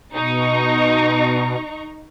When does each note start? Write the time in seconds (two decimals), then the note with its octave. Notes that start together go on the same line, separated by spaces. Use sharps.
0.14 B2 D#4 A#5 C#6